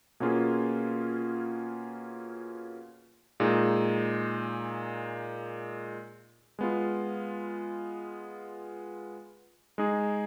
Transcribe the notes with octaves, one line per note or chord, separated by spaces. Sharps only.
B2 A#3 C#4 F4 G#4
A#2 G#3 D#4 G#4
G#3 B3 F4
G#3 D#4 G#4